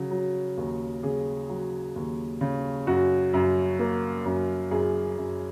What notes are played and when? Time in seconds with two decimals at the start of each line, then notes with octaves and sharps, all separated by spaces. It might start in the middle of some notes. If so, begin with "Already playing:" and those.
Already playing: C#3 F#3
0.11 F#3
0.57 D#2
1.03 C#3 G#4
1.49 F#3
1.96 D#2
2.41 C#3
2.87 F#2 F#4
3.33 F#2
3.79 A#3
4.25 F#2
4.71 F#2 G#4
5.18 F#2